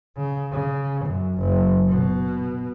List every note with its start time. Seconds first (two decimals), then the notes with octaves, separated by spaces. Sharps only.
0.17 C#3
0.52 C#3
1.05 F#2
1.39 F#1
1.89 B2